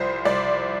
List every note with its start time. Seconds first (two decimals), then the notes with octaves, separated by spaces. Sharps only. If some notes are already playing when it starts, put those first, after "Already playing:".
Already playing: C2 F3 C5
0.25 C2 D5